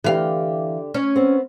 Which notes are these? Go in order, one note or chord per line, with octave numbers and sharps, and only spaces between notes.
D3 E3 G4 F5
C#4
B3 C4